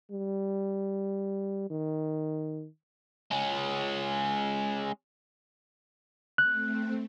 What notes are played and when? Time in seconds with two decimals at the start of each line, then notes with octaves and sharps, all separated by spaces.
0.11 G3
1.70 D#3
3.31 G#3 C#4
6.38 A3 C4 F#6